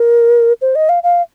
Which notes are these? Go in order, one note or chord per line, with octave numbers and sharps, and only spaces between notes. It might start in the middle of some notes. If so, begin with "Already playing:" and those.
Already playing: A#4
C5
D#5
F5
F5